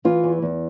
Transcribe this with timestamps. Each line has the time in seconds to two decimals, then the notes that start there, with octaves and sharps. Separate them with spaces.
0.05 E3 F4
0.24 E2
0.42 E2